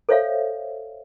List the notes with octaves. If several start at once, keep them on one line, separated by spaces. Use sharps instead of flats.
A4 C5 C#5 E5 F5